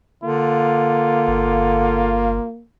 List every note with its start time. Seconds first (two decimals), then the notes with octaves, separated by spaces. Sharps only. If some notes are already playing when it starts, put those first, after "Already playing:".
0.23 D3 A#3 F4
1.28 G1